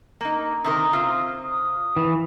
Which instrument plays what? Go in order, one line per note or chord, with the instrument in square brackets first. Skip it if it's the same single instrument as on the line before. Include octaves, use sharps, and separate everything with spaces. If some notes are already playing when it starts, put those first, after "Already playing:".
[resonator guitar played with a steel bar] A#3 D#4
[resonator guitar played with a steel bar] C3 D#3 A#4 [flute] D#6
[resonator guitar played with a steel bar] C3 F4
[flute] D#6
[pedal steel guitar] E3